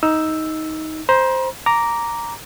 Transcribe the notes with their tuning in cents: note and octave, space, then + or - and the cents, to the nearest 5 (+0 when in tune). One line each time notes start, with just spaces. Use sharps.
D#4 +15 E6 +0
C5 +0 A#5 +40
A#5 +0 D6 -10